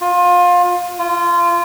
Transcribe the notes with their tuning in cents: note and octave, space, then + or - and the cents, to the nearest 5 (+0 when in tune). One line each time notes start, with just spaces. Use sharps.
F4 +25
F4 -20